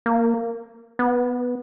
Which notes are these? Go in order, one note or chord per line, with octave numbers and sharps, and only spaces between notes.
A#3
B3